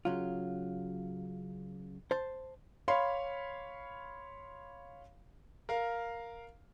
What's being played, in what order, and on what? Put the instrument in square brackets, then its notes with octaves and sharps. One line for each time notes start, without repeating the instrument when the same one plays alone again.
[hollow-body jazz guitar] C#3 F#3 F4
C5 A5
[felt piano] C#5 F5 B5 C6 C7
[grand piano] A#4 F5